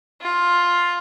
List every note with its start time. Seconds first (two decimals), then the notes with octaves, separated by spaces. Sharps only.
0.21 F4